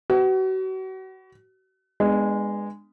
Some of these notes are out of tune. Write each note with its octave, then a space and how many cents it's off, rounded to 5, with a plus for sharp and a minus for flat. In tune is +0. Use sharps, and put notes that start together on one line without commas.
F#4 +35 B4 +35
G#3 -15 B3 +0 D4 +25